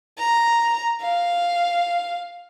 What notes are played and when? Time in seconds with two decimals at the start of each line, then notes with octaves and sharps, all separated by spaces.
0.19 A#5
1.02 F5